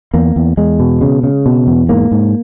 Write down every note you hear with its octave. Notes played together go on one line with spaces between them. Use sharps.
E2 A#3
E2
E2 G#3
B2
C#3
C#3
B2
E2
G#2 A#3
G#2